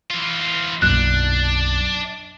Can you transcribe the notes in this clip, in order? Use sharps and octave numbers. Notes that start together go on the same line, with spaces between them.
E3 F4
B1 F#2 A#2 D4 F#6